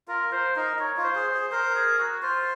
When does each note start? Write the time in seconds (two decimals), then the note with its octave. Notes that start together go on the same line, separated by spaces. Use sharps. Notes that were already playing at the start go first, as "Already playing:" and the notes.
0.08 F4 A#4
0.32 F4 C5
0.56 D#4 A#4
0.79 D#4 C#5
0.97 F4
1.04 C5
1.15 G#4
1.28 C5
1.34 G#4
1.51 A#4 C5
1.75 G#4
1.99 F#4
2.22 F4 C5